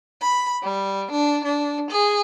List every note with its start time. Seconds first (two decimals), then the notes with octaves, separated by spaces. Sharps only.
0.22 B5
0.64 G3
1.12 D4
1.44 D4
1.90 G#4